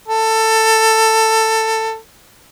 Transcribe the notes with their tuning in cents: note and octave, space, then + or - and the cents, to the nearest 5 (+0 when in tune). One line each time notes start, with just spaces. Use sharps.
A4 +15